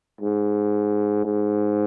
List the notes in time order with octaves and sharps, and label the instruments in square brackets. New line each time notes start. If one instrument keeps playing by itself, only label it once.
[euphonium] G#2
G#2